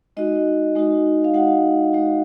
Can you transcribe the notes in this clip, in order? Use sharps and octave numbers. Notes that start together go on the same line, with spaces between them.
G#3 D#4 F#4 D#5
G#3 D#4 F#4
F5
G#3 D#4 F#4 F#5
G#3 D#4 F#4